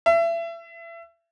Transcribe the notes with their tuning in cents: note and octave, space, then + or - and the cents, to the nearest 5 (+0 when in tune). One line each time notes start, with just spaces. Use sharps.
E5 +30